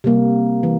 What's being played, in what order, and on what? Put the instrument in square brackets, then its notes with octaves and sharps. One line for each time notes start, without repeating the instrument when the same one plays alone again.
[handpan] C3 G3 A#3
E3